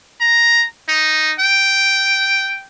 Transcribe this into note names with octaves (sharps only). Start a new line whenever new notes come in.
A#5
D#4
G5